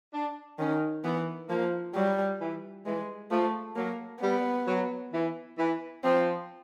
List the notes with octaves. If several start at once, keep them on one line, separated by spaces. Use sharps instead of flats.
D4
D#3 C#4
E3 B3
F3 A#3
F#3 G3
E3
E3 G#3
F3 A3
F#3 A#3
G3 B3
F#3
E3
E3
F3 C4